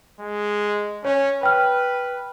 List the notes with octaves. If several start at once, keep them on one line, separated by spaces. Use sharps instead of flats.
G#3
C#4 C#5
B4 G5 F6